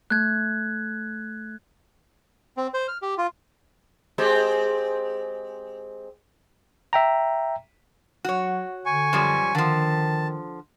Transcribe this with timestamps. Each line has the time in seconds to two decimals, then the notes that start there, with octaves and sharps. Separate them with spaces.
0.10 A3 F#6 G#6
2.57 C4
2.74 C5
2.88 F6
3.02 G4
3.18 F4
4.18 G#3 C4 G4
6.93 E5 G5 A#5
8.25 F#3 F#4 C#5
8.86 D3 G#5 C#6
9.13 F#2 F3 G3
9.55 D3 D#3 F3 A5